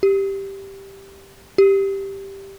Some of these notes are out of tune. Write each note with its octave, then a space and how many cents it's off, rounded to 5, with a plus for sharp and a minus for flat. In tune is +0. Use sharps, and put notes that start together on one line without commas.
G4 +0
G4 +0